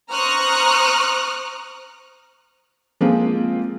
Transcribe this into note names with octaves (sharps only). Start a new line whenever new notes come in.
C5 A#5 C#6 D#6 F6 F#6
F3 G#3 A#3 C4 F4